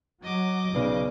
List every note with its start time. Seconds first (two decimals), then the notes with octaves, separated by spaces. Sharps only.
0.23 F#3 D#5 D6
0.75 B1 C#3 B3 B4 D5